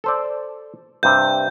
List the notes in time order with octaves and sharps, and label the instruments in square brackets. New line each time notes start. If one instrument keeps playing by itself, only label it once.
[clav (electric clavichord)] A4 C5 D5
[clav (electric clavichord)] G2 C3 [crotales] G6